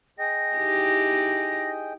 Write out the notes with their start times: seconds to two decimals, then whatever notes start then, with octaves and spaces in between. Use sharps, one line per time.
0.19 G#4 D#5 G5 A#6
0.56 D#4 E4 G4